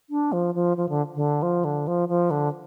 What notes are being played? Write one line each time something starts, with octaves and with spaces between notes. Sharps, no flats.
D4
F3
F3
F3
D3
D3
F3
D3
F3
F3
D3